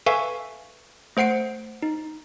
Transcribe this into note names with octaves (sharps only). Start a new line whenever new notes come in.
A4 B4 E5 F5 G#5 C#6
A3 C5 F#5 C7 D7
D#4